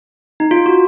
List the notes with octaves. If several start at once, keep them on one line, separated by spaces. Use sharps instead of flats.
D#4
F4
F#4